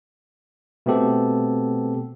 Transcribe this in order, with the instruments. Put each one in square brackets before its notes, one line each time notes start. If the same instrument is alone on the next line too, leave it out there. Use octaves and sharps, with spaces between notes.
[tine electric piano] B2 A3 B3 C4 G4 A4